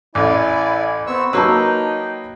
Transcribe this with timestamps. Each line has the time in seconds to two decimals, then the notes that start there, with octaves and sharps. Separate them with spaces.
0.15 A1 E4 D5 G#5
1.07 B3 C4 C#6 E6
1.33 F#3 A#3 D#4 B4 G5 A5 C#6 E6